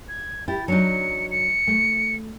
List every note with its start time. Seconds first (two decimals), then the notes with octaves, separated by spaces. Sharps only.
0.09 G#6
0.48 E4 G4 A6
0.68 F#3 D4 D#4 C#7
1.31 C#7
1.67 A3